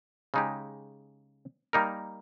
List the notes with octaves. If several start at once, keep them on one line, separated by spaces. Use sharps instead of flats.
C#3 G#3 D#4 G4
G3 A#3 D#4 A#4